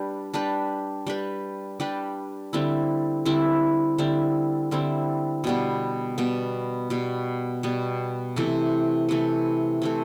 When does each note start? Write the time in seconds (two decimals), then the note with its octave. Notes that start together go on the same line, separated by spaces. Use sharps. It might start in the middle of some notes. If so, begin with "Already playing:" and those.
Already playing: G3 D4 G4 B4
0.34 G3 D4 G4 B4
1.07 G3 D4 G4 B4
1.80 G3 D4 G4 B4
2.53 D3 G3 C4 E4
3.25 D3 G3 C4 E4
3.98 D3 G3 C4 E4
4.71 D3 G3 C4 E4
5.44 B2 G3 B3
6.18 B2 G3 B3
6.90 B2 G3 B3
7.63 B2 G3 B3
8.36 C3 E3 A3
9.09 C3 E3 A3
9.82 C3 E3 A3